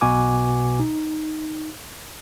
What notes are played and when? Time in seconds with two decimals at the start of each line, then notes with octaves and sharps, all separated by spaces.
0.01 B1 B2 F#4 G#5 D6
0.80 D#4